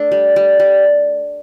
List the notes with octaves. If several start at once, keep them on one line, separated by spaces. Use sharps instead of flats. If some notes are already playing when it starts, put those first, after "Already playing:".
Already playing: A3 D4
G3
G3
G3